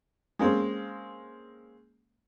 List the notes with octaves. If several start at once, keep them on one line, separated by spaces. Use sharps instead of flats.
G#3 A#3 C4 C#4